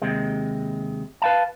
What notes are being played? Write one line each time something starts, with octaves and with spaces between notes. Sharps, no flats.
D#2 C3 G#3
B4 F5 A5